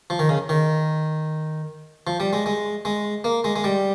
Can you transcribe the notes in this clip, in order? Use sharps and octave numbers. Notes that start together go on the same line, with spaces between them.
F3
D#3
C#3
D#3
F3
G3
G#3
G#3
G#3
A#3
G#3
G#3
G3